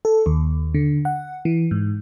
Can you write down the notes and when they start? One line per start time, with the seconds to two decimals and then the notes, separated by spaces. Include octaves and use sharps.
0.05 A4
0.26 D#2
0.74 D3
1.05 F#5
1.45 E3
1.71 G#2